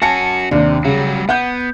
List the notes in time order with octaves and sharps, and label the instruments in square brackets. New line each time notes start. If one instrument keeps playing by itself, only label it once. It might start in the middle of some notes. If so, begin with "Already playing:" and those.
[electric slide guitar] C#4 F#4 [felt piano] G#5 A5 C#7
[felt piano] D#2 D4 [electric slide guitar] C3
[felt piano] C#3 [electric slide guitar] F#3 G3
[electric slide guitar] B3 [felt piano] F#5 G6